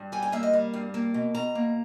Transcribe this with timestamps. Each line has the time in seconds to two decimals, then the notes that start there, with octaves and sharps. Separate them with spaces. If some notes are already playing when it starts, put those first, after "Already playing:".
Already playing: G2
0.12 G3 G#5
0.23 G#5
0.32 A#3 E5
0.43 D#5
0.53 G3
0.74 G2
0.94 A#3
1.14 B2
1.35 B2 A#5
1.55 A#3